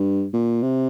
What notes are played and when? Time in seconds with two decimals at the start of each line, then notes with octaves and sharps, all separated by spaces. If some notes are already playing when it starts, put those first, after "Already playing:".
Already playing: G2
0.33 A#2
0.63 C3